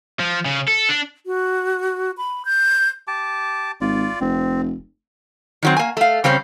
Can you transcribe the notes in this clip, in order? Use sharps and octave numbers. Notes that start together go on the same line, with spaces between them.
F3
C#3
A4
D4
F#4
B5
G6
G4 A5 D6
G#1 F4 D5
F1 C4
D#3 F#3 C4
A#3 G#5
A3 F5
C#3 G3 C4 C#4